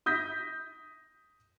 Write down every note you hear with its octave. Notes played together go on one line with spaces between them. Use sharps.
D#6 G6 A#6 B6